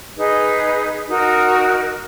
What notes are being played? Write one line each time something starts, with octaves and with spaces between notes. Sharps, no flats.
D#4 G#4 B4 D#5
D#4 F#4 A#4